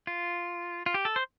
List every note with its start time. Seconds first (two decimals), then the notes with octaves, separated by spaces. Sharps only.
0.07 F4
0.86 F4
0.94 G4
1.05 A4
1.16 C5